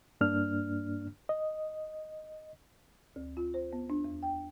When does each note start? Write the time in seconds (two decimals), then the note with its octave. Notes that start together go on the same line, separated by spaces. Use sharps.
0.21 G2 A#3 D4 F6
1.29 D#5
3.16 D2
3.37 F4
3.54 C5
3.73 B3
3.90 D4
4.04 E2
4.23 G5